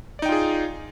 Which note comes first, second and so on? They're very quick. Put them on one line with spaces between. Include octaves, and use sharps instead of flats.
D5 D#4 G5 F4 G#4